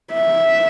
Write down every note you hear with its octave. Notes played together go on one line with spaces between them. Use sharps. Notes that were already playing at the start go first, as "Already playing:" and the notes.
E5